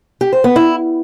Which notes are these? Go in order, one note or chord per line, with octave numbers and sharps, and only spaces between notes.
G4
C5
B3
E4